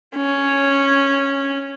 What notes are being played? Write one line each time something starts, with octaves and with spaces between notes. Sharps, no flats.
C#4